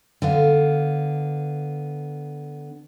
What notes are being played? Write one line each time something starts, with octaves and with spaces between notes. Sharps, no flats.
D3 B3 F5